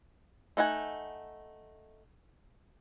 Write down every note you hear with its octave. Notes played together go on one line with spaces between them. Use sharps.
A3 D#4 F#5 G#5